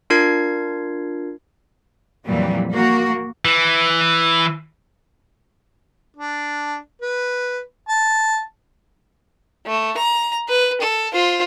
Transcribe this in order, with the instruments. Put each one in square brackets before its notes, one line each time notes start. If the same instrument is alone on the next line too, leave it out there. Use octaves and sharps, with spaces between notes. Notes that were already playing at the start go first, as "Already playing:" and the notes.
[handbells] D4 F4 A#4 G#6 C7
[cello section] F2 A#2 E3 F#3 G3
A#3 F#4
[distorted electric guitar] E3
[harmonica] D4
B4
A5
[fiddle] A3
A#5
B4
A4
F4 C5